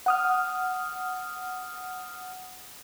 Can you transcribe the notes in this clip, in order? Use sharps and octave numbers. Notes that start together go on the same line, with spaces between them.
F#5 D#6 F6